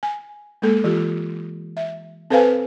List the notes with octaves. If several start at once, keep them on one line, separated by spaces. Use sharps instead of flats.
G#5
G#3 A#3 A4
E3 F4 G4
E5
C4 A4 B4 C5 F5 G#5